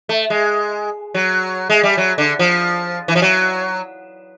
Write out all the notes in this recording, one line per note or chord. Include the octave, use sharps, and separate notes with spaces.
A3
G#3
F#3
G#3
G3
F#3
D3
F3
E3
F3
F#3